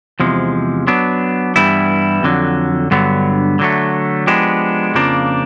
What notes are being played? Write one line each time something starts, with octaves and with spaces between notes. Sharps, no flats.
E2 C3 F3 G#3
F#3 B3 D4
G2 E3 G3 B3 E4
F2 D3 F#3
G2 D3 F#3 B3
D3 F#3 A3
F3 G#3 B3 D4 G4
F2 C#3 F3 A#3 D4